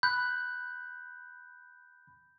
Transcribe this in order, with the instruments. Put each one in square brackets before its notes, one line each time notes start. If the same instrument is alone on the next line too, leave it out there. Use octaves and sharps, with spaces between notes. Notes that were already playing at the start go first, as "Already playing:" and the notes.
[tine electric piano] B5 F#6 [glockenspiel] G6